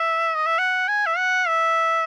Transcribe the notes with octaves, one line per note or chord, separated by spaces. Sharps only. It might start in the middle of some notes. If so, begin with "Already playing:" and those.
Already playing: E5
D#5
E5
F#5
G#5
E5
F#5
E5